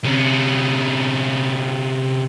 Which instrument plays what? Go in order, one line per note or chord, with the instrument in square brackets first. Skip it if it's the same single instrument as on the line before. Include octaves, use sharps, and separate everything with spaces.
[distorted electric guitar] C3 C#4